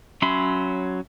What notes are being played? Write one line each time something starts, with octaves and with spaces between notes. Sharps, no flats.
F#3 C#4 E5 B5 C6